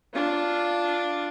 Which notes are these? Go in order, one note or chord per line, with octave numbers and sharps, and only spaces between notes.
D4 F4